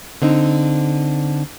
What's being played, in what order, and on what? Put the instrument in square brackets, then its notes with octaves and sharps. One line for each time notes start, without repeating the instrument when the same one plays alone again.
[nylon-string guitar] D3 C4 D#4